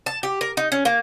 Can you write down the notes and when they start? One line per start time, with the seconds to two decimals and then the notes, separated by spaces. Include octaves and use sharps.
0.06 A5
0.23 G4
0.41 A#4
0.57 D#4
0.72 C#4
0.85 A#3